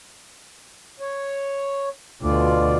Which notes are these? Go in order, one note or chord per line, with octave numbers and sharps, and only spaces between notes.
C#5
D2 B2 F4 D5